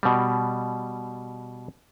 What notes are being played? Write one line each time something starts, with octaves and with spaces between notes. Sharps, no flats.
B2 G3